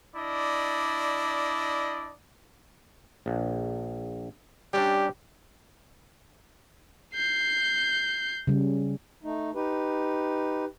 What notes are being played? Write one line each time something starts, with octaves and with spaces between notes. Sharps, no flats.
D4 E4 D5 D#5
A#1
G3 C#4 D4 G4
G6 C7
C#3 G3
A3 D#4
D#4 G4 B4